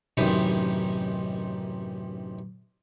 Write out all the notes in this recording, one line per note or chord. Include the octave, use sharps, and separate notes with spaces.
A1 F#2 C3 D#3 D#4 B5